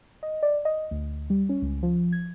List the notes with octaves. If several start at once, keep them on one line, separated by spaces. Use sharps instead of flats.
D#5
D5
D#5
D2
G3
C#4
C#2
F3
G#6